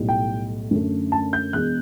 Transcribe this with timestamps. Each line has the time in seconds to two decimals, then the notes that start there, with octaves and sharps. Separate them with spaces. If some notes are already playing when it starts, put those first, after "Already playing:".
Already playing: B1 A2 G3
0.09 G5
0.71 F#2 D3 A3
1.12 A5
1.33 G6
1.53 E1 E2 B2 F#6